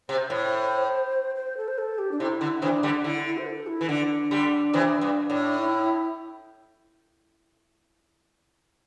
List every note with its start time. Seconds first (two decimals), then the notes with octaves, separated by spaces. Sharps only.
0.09 C3 C5
0.30 A2
1.36 C5
1.57 A4
1.68 C5
1.78 A4
1.99 G4
2.12 D4
2.20 C3 E4
2.41 D3
2.62 C3 E3 D4
2.83 D3 G3
3.04 D3 E4
3.26 E4
3.38 C5
3.46 A4
3.67 E4
3.81 E3
3.89 D3 D4
4.31 D3 G3
4.73 C3 E3
5.01 G2
5.30 A2
5.58 E4